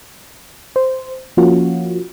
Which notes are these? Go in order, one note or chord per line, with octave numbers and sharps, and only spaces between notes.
C5
F3 A#3 C#4 F4 F#4